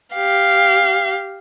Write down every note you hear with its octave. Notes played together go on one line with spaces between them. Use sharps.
G4 F5